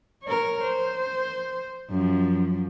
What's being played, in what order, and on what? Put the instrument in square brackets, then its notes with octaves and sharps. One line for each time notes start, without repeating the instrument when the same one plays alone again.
[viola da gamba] A#4 C#5
C5
F#2 F3